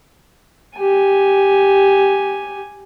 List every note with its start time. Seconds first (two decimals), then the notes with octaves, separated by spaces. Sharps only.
0.79 G4 G#5